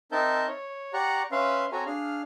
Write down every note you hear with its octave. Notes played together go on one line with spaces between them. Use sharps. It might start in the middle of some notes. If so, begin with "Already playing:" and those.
C4 D#4 A#4 E5 A5 G6
C#5
G4 D5 F#5 A#5 C#6
C#4 B4 E5 F5 C6
C4 F#4 A4 C#5 G#5 A#5
D4 G#4 F5 F6